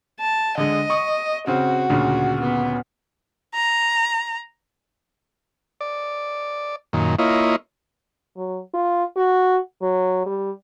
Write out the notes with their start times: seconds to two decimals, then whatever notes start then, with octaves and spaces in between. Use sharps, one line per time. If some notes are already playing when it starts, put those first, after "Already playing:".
0.20 A5
0.58 D3 G#3 D#5
0.90 C#6 D#6
1.47 C#3 C4 F#4
1.90 D2 A#2 C#3
2.41 B3
3.55 A#5
5.81 D5
6.93 F#2 A#2 D#3
7.19 A#3 E4 F4 C#5 D#5
8.37 F#3
8.74 F4
9.17 F#4
9.82 F#3
10.26 G3